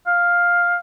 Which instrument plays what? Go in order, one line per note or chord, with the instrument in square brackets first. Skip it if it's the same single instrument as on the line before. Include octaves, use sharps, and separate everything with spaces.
[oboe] F5